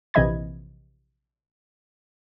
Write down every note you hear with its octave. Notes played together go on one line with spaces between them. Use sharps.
A#1 C3 E3 D#5 B5 G#6